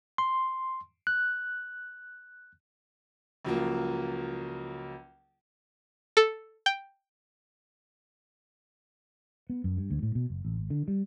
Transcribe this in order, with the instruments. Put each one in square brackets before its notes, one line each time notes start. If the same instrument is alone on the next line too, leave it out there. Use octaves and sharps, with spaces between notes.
[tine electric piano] C6
F#6
[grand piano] C#2 F3 F#3 A#3
[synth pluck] A4
G5
[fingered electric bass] B3
F#2
G2
D2
A2
B2
F#1
A1
G#1
D3
G3